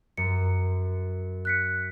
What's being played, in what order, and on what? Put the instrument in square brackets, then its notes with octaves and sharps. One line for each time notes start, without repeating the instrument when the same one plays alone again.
[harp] F#2 [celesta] C#7
[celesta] F#6 B6 C#7